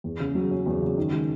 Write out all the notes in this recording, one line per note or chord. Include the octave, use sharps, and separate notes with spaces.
E2
C#3
F#3
C#4
E2
C#3
D#3
G#3